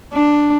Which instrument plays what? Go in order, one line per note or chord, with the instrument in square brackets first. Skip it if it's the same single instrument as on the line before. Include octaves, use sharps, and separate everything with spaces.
[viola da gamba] D4